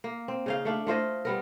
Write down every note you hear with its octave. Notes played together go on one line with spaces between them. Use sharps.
A#3
C4
C#3 D#4 F5
A3 D4 F5
A3 F4 C5 D#5
G3 B3 A#4